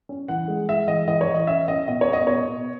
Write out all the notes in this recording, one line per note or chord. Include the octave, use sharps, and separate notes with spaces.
C#4
E3 F#5
G#3
G#3 E5
E3 D#5
E3 D#5
C#5
E3
D#5
C#4 E5
C#4 D#5
B2 D#5
C#5
B3
D#5
B2 C#5
B2